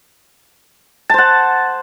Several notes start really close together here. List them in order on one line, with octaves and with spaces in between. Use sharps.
A5 C5 F#5